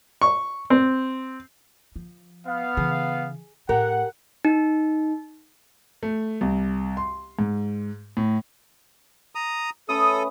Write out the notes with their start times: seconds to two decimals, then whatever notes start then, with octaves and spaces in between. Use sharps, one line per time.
0.22 C#6
0.70 C4
1.96 F3
2.46 B3 F5
2.77 C#3 E3 G#4
3.69 A2 G4 A#4 F#5
4.45 D#4
6.03 A3
6.41 C2
6.97 C6
7.39 G#2
8.17 A2
9.35 A#5 D#6
9.89 A3 C#4 A4 B4 D#6